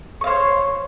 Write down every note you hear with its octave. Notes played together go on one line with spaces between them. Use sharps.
C5 C#5 F5 C#6